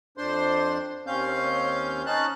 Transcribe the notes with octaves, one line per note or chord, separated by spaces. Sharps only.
F2 D4 C5 C6
D#2 C4 C#4 F5 G6
C#4 D#4 A5 F#6